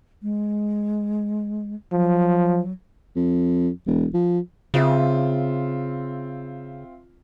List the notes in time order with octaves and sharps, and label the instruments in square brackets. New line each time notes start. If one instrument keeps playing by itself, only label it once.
[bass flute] G#3
[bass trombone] F3 [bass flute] F#3
[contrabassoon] F2
E1
F3
[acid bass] C#3 [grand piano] C4 F4 E5